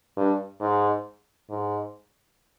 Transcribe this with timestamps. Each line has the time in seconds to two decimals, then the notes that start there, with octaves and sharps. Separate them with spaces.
0.17 G2
0.61 G#2
1.49 G#2